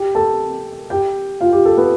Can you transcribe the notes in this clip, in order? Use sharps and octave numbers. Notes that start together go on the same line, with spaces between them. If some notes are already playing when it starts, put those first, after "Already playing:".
Already playing: G4 G5
A4 A5
G4 G5
F4 F5
G4
A4
B3 B4